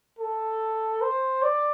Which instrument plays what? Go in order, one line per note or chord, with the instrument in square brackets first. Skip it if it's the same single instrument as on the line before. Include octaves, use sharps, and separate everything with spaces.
[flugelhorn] A4
C5
D5